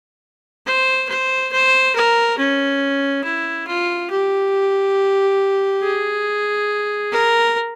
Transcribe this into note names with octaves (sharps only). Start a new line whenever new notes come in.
C5
C5
C5
A#4
C#4
E4
F4
G4
G#4
A#4